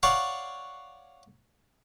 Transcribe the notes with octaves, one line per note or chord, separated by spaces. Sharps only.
C#5 D5 F5 F#5 C#6